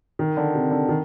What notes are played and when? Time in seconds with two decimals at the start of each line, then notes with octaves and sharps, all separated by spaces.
0.19 D#3
0.37 D3
0.54 C3
0.71 D3
0.89 D#3